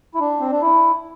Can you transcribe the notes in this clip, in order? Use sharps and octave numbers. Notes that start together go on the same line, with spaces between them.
E4
D4
C4
D4
E4